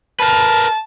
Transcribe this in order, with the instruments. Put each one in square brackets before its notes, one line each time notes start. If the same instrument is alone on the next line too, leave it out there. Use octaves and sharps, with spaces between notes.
[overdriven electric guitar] A#4 B4 [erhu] A5